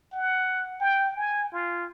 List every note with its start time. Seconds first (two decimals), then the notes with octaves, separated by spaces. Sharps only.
0.12 F#5
0.80 G5
1.16 G#5
1.52 F4